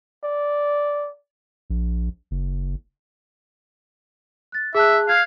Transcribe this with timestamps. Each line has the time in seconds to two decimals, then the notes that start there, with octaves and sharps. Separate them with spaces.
0.24 D5
1.70 A#1
2.31 F#1
4.52 F#6 A6
4.75 G#4 E5 A5 F#6
5.08 F5 F#6 G#6 C7